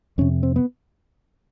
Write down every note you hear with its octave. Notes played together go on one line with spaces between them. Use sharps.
F2 C3 C#4
C4
B3